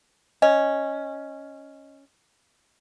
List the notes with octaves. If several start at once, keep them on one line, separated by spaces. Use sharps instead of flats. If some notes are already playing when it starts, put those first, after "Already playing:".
C#4 D#5